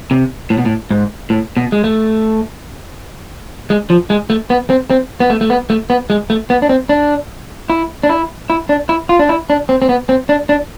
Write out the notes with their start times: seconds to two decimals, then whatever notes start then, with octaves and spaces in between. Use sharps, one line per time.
0.11 C3
0.50 A2
0.58 B2
0.65 A2
0.91 G#2
1.30 A2
1.57 B2
1.72 G#3
1.84 A3
3.70 G#3
3.90 F3
4.10 G#3
4.30 A3
4.50 B3
4.70 C4
4.90 C4
5.20 B3
5.30 A3
5.41 A3
5.50 B3
5.70 A3
5.90 B3
6.10 G#3
6.30 A3
6.50 B3
6.62 D4
6.69 C4
6.89 D4
7.70 E4
8.03 D4
8.09 E4
8.50 E4
8.69 D4
8.89 E4
9.09 F4
9.19 D4
9.29 E4
9.50 D4
9.69 C4
9.82 C4
9.89 B3
10.09 C4
10.29 D4
10.49 D4